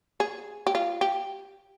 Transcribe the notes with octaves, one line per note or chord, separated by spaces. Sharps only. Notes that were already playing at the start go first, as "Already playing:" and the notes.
G#4
G4
F4
G4